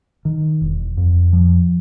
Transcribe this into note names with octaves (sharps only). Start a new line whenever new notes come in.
D#3
E1
F2
F3